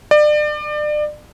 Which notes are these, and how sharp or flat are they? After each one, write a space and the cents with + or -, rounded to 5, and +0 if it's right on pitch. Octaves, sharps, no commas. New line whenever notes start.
D5 +30